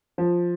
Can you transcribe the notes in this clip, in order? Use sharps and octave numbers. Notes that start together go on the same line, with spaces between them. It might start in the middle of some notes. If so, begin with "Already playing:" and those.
F3